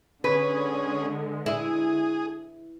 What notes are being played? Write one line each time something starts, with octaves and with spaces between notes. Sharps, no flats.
D3 G#3 C#4 G#4 B4
E4 G#4